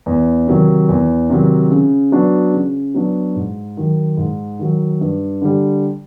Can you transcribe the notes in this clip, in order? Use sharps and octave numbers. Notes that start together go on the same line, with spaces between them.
E2
C3 D#3 F#3
E2
C3 D#3 F#3
C#3
F#3 B3 D4 F#4
C#3
F#3 B3 D4 F#4
G#2
D#3 F#3
G#2
D#3 F#3
G2
D3 G3